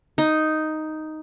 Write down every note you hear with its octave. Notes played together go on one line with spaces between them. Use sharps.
D#4